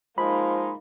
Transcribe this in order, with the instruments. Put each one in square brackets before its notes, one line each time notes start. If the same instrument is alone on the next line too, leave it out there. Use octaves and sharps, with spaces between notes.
[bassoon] F3 [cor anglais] G#3 [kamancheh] A#3 D#4 [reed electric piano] B5